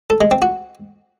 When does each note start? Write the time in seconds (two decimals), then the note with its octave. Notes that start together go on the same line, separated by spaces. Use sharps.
0.10 A4
0.21 G#3
0.31 C4
0.42 F#4